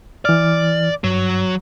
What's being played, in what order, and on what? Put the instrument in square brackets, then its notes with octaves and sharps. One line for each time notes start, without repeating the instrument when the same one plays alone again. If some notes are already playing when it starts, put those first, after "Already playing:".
[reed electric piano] E3 F6 [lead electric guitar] D5
[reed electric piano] G2 [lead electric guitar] F#3